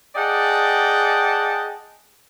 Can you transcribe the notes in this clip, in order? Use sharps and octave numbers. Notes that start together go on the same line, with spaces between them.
G#4 D5 D#5 F#5 G5 A5